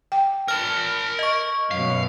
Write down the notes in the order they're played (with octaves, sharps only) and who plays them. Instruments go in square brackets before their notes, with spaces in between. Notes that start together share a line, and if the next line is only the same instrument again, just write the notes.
[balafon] G5
[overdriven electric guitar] A#4 A5 [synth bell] F6
[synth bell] D#5 C#6
[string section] F#2 B2 [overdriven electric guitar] F5